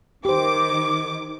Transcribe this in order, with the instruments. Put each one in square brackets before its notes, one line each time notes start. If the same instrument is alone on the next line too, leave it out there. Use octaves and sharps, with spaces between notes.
[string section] D#3 D6 [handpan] G4 C5